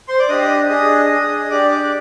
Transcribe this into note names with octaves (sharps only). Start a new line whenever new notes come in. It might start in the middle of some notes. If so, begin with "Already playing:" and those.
C5 C6
D5 D6
D4 G4 D#5 D#6
D#5 D#6
D4 G#4 D#5 D#6
D4 G#4
D#6
D4 G4 D5 D6
D5 D6